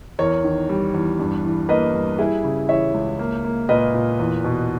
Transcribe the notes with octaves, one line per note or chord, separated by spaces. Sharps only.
E2 A#4 C#5
D#3
G3
E2
G2
E3
A#3 B4 D#5
G2
G3 E4 G#4
C#3
E3 C#5 E5
C#2
A#3
A#3
A#2 B4 D#5
A#2
E2
B2